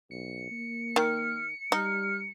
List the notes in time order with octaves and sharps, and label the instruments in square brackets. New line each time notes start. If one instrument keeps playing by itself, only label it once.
[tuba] B1 [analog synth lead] C#7
[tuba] A#3
[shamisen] D#3 [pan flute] F6
[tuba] G3 [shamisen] D#4 [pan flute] F6